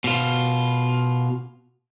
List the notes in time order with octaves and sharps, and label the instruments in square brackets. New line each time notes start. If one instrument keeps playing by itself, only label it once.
[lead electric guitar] B2 F4